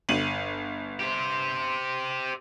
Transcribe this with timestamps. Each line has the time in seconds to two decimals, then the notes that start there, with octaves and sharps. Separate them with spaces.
0.09 G1 D#7 F#7
0.99 G4 C5